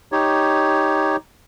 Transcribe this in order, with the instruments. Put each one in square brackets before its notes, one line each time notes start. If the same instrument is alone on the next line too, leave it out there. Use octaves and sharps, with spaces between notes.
[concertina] D#4 G4 C#5